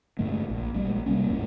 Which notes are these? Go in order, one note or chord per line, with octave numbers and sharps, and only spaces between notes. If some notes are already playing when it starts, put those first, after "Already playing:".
G2 D3 G#3 A3
A#1
G3 G#3 C4
A#1
C3 G3 A#3 C#4
A1 E2 G#2 G#3